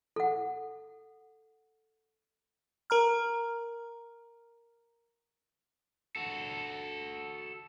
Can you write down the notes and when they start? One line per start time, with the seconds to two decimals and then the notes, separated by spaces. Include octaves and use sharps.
0.16 A4 F#5
2.90 A#4 A#5 F6
6.16 F#4 A4